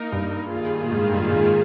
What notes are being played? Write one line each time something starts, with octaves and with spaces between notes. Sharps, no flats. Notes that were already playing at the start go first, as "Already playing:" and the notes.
Already playing: A#3 D#4 A#4
G2
D#3 A#3 F4 G#4
A#2
G#2
G2
G#2